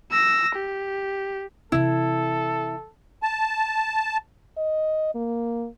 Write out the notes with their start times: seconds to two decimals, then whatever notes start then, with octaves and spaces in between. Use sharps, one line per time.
0.12 E6 A#6
0.55 G4
1.72 C3 E3 E4 A4
3.23 A5
4.57 D#5
5.15 A#3